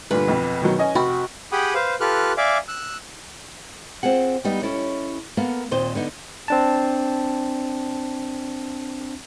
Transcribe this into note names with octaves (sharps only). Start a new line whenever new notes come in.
G2 A#2 D3 B4
B1 F2
B2 D#3 F#3
C#4 D#5 G#5
F1 F#4 G5 B5
G4 G#4 F#5 G5 B5 D#6
B4 C5 F5
F4 G4 A4 B4 F6 F#6
D5 E5 F5 G#5 D6
E6 F#6
C4 F4 G#4 F#5
G3 B3 D#4
C#4 E4 A4 C#5
A#3 B3 A4 F5
D#2 A#2 C4 C5 D#5
D3 B3 D#4
C4 D4 A5